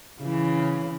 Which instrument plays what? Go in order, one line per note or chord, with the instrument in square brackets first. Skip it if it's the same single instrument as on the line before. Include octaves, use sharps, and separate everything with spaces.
[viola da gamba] C#3 E3